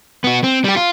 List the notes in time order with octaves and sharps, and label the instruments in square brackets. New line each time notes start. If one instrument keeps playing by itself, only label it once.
[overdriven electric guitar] B3 F#4
C4
G3 G4
F4